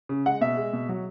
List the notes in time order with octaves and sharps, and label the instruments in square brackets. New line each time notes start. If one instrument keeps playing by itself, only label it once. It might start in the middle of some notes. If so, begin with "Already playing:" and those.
[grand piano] C#3
G#3 F#5
B2 E5
G#3
B2
F#3